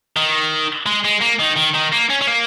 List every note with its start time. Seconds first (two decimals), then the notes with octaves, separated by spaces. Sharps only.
0.17 D#3
0.86 G#3
1.05 G#3
1.22 A#3
1.40 D#3
1.57 D#3
1.75 D#3
1.93 A#3
2.10 C#4
2.21 C#4
2.27 A#3